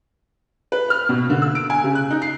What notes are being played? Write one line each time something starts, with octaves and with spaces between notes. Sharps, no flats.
B4
F6
B2
D3
E6
D7
G#5
C#3
F#6
D#4
C7